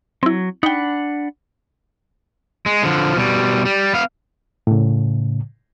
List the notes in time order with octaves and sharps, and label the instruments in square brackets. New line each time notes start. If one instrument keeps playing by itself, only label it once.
[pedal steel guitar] F#3 [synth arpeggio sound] C4 E4
[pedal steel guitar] D4 F#5 B5 [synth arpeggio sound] D#4 G5
[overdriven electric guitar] G#3
D3 F3
B2 G3
G3
B3 F5
[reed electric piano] A2 C#3